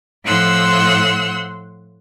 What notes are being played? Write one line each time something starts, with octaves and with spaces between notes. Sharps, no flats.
A2 F3 C5 F#5 C6 E6